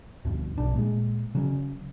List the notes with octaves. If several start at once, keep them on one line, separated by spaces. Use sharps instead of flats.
D2 G2
B1 D4
A#2 G#3
C#3 F#3 C#4